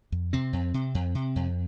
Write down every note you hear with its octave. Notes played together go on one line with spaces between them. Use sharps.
F2
C3 C4
F2
C3
F2
C3
F2